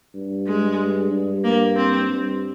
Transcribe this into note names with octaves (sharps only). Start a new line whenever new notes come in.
G2
G#3
G2
A#3
C4
G2